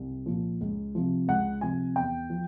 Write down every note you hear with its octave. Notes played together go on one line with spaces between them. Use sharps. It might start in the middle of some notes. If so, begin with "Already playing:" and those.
Already playing: C2
A#2 F3
C#2
C3 F3
C#2 F#5
C3 F3 G#5
E2 G5
F3